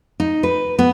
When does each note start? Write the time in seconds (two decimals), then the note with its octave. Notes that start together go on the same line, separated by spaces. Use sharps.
0.20 D#4
0.43 B4
0.79 B3